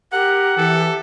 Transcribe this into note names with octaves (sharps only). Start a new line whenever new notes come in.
G4 A#4 F#5
E3 A4